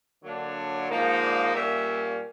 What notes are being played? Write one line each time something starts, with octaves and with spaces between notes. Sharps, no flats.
D3 F#3 A#3 D4 C#5
G#2 F3 A#3 D#4
D5
A#2 G3 A#3 C#4 E5